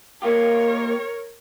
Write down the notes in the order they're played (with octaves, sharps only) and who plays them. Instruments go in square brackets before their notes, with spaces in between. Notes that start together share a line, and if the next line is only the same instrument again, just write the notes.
[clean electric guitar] A#3 F4 G4 [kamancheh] A#4 C#5